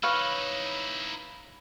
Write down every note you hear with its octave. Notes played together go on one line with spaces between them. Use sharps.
D#4 E4 B4 C#5 F5